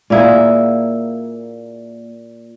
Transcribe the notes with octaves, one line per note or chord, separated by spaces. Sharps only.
A#2 A#3 E4 G#4